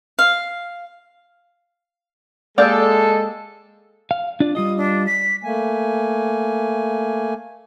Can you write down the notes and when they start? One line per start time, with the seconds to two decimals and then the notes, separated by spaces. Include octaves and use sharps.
0.19 F5
2.58 G#3 A#3 G4 A4 D5
4.11 F5
4.40 D4 F4 D5
4.55 G3 F4 D#5 D#6
4.77 D4
5.06 B6
5.43 A3 A#3 G#5